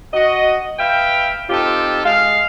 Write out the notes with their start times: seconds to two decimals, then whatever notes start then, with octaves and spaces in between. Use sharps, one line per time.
0.13 F#4 D#5
0.79 B4 E5 F5 G5
1.50 C4 D#4 F4 G4 A4
2.04 G#3 F5